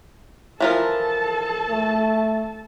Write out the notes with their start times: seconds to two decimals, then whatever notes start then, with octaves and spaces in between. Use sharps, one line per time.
0.60 E3 F3 A4 A#4 A5
1.70 A3